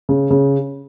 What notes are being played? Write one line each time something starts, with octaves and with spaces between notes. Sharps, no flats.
C#3
C#3